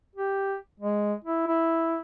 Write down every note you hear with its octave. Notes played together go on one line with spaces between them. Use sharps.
G4
G#3
E4
E4